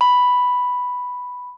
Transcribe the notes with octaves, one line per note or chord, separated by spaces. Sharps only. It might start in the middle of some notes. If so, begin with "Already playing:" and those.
B5